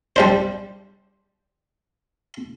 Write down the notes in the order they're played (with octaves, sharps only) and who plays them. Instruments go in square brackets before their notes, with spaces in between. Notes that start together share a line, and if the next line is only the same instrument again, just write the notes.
[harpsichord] G3 D4 C5